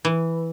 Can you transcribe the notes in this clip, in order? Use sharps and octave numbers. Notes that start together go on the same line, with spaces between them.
E3